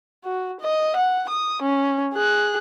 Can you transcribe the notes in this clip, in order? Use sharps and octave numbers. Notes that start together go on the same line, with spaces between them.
F#4
D#5
F#5
D#6
C#4
G#4 F#6